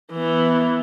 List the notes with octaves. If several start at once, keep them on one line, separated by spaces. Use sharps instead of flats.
E3 B3